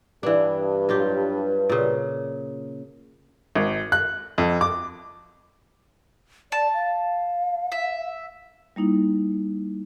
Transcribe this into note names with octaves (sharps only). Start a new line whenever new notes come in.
G2 E3 D4
F#3 F4 G4
A#2 C#3
G#1
F#6
F2
D6
D5 A5
F5
E5
G3 A#3 D#4 E4